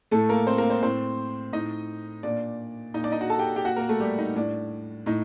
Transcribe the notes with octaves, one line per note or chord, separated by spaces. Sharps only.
A2 A3 A4
A#3 A#4
C4 C5
A#3 A#4
C4 C5
A2 C4 C5
A2 D#4 D#5
A#2 D4 D5
A#2 D#4 D#5
D4 D5
D#4 D#5
F#4 F#5
A4 A5
G4 G5
G4 G5
A#2 F#4 F#5
A#3 A#4
A3 A4
G3 G4
D#4
A2 D4
A2 D#4